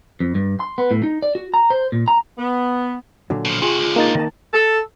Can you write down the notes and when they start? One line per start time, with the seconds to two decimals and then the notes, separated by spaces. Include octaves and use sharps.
0.20 F2
0.35 G2
0.60 C6
0.78 B3
0.91 A2
1.03 D#4
1.22 D5
1.35 F#4
1.54 A#5
1.70 C5
1.92 A#2
2.08 A#5
2.38 B3
3.30 A#2 D3 F#3
3.45 B2 F3
3.62 C3 F4 F#4 G#4
3.79 C#2 D3
3.96 A#3 D#4 A6
4.15 D#3 A#4 D#5 A5
4.54 A4